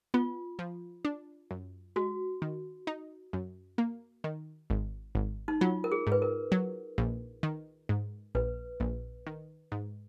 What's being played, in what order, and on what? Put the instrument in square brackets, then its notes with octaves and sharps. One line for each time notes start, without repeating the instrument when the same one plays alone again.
[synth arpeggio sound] B3 [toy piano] F4
[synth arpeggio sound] F3
D4
F#2
[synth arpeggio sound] G#3 [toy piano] F#4
[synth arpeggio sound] D#3
D#4
F#2
A#3
D#3
G#1
G#1
[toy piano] D#4
[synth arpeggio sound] F#3 [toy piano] F4
[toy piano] A#4
G#4
[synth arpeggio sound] G#2
[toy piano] B4
A#4
[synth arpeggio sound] F#3
A#1
D#3
G#2
[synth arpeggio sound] A#1 [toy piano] B4
[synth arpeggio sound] A#1
D#3
G#2